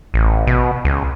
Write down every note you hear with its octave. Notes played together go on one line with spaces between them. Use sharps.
A1
B2
C#2